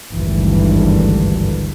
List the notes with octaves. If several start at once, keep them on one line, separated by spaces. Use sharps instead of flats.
G#1 D2 G2 E3